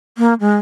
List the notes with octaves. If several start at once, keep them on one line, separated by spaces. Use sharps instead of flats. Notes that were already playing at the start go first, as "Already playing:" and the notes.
A#3
G#3